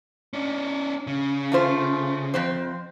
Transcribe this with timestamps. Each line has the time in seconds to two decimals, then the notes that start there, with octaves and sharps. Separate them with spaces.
0.33 C#4 D4
1.07 C#3
1.52 A3 F4 C5
2.34 F2 C4 C5